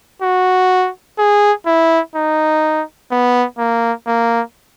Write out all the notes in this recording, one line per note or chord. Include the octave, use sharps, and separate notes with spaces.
F#4
G#4
E4
D#4
B3
A#3
A#3